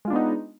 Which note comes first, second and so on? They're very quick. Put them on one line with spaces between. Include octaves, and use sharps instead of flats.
G#3 F4 D4 B3 D#4